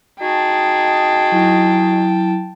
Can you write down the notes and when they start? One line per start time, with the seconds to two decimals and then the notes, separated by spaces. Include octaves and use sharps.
0.22 D#4 F#4 G#4 G5 A5
1.32 F#3 E4